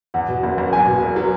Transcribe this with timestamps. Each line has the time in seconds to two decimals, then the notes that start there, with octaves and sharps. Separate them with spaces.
0.14 E2 F#5
0.28 B2
0.43 F#1
0.58 F#1
0.73 E2 G#5
0.87 B2
1.02 E1
1.16 F#3